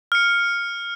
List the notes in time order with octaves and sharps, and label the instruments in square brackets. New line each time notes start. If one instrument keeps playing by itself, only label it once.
[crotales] F6 C#7